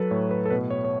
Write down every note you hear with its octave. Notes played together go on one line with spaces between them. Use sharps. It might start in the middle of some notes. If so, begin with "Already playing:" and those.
Already playing: F#3 A4 B4
A2 C#5
B4
A4
B2 B4
C#5
C#5